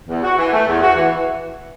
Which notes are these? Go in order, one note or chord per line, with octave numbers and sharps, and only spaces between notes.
E2
F#4
E3
A3
E2
F#4
E3